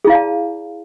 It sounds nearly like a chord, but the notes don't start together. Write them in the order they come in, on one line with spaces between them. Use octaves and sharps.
G#4 E4 F5 D5 A5